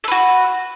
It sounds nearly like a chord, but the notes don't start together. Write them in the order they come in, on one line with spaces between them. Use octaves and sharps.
A4 B4 F#4